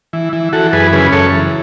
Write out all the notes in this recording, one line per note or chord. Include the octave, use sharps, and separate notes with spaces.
E3
E3
E3 F#4 A4
F#2 G#4 B4
C#3 G#4 B4
F#2 A4 C#5
E3